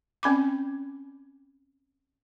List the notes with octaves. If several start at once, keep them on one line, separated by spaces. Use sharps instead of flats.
C4 C#4 B5 D6